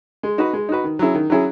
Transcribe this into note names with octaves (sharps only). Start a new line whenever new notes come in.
G#3
D#4 F#4 B4
G#3
D#4 F#4 B4
D#3
F#3 C#4 E4 G#4
D#3
F#3 C#4 E4 G#4